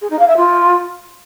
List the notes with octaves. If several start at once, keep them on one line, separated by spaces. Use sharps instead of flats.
G#4
D#4
F5
E5
F4